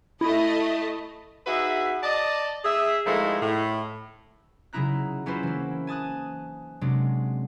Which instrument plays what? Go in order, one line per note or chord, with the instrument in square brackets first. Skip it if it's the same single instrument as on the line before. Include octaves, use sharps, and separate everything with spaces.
[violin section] A3 D#5 [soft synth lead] E4
[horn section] D#4 F#4 G#4 B4 E5
D5 D#5 A5
G#4 E5
D#3 F3 G#3 A3 D#4 E4
A2
[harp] C#3 F#3 D#4 E4 A#5 F#6
F#3 C#4 E4 F4 B4 C5
E3 A#3
G#5 A5 D#6 F#6
C3 F#3 G#3 D4